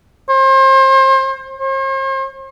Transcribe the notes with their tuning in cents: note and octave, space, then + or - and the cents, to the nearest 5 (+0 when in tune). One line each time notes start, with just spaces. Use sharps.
C5 +35
C5 +45